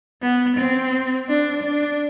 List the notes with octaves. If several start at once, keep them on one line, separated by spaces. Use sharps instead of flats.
B3
C4
D4
D4